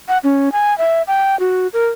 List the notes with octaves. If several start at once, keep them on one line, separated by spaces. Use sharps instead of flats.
F#5
C#4
G#5
E5
G5
F#4
A#4